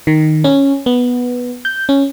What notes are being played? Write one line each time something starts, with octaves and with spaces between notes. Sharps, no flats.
D#3
C#4
B3
G6
C#4